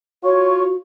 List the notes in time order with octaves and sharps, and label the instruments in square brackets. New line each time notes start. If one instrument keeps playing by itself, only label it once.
[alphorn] F4 [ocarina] F#4 [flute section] C#5 C#6